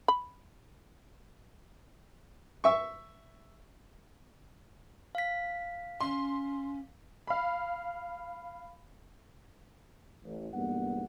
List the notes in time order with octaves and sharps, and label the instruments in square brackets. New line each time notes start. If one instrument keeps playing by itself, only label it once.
[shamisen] B5
[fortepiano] E5 C#6
[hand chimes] F5 B6
[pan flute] C#4 [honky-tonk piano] C6
[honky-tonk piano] F5 B5
[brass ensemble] A1
B1 E2 G2 A#3 B3 F#5